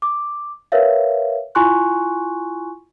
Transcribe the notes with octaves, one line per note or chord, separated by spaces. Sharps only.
D6
A#4 B4 C#5 E5 F5
E4 F4 G#5 C6 C#6 F#6